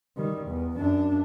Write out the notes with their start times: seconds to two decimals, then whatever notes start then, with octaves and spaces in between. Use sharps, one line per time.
0.17 D#3 G3
0.47 E2
0.77 F#2 D4